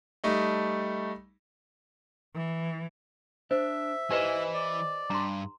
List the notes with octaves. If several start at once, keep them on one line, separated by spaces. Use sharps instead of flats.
G3 A3 D#4
E3
D4 C5 E5
E3 G4 B4 C5 D#5 G#5
D5
G2 A#5 C6